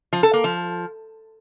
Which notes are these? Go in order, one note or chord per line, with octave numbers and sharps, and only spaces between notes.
F3
A4
A#3
F3